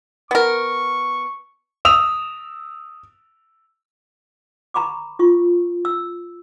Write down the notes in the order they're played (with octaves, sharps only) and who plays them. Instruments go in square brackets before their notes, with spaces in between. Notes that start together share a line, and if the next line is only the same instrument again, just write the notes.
[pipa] B3 A#4 [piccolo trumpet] C#6
[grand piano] D#6 E6 F7
[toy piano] A#5 B5 C#6 D6
F4 C#6
E6